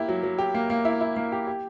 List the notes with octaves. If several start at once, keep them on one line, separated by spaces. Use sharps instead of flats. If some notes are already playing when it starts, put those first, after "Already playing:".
Already playing: A#3 E4 G4
F#3
F#3
G4
A#3
A#3
E4
E4
A#3
G4
G4